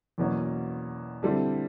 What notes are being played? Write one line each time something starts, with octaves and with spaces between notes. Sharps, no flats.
E2 B2 F#3 A#3 C#4
D3 G3 C4 E4